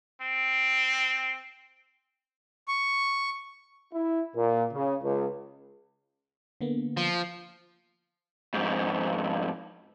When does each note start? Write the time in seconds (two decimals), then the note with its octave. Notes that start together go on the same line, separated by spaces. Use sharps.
0.22 C4
2.68 C#6
3.93 E4
4.35 A#2
4.72 C#3
5.03 C#2
6.61 D3 A#3 B3
6.97 F3
8.54 F2 G#2